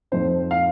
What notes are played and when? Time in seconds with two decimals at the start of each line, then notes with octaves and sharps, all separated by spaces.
0.12 F2 F3 C4 D#4 C5
0.51 F5